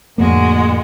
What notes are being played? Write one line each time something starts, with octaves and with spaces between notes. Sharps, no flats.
F2 A2 D3 G#3 A#3 F#4